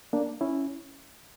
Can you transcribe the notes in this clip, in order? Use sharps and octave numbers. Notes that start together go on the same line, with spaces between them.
A#3 D4
C#4 E4